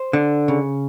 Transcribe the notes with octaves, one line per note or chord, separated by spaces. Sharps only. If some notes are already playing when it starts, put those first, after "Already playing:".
Already playing: C5
D3
C#3